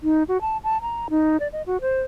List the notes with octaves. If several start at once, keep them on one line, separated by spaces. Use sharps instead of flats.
D#4
F#4
A5
A5
A#5
D#4
D5
D#5
F#4
C5